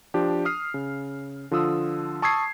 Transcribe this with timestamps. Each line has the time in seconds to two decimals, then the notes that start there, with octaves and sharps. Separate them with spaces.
0.14 F3 D4 G4
0.45 D#6 F6 C7
0.74 C#3
1.51 D3 F3 F4 D#6 E6
2.22 A5 C#6 D#6 E6 G#6 C7